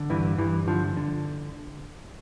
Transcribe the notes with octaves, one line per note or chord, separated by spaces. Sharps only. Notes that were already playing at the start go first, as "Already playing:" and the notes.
Already playing: D3
G2 E3
G2 E3
D3 F3
D3